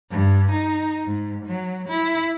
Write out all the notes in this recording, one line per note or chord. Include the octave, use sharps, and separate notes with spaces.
G2
D#4
G#2
F#3
E4